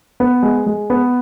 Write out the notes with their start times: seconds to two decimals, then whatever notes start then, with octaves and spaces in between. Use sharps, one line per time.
0.20 B3
0.43 G#3
0.66 G#3
0.90 B3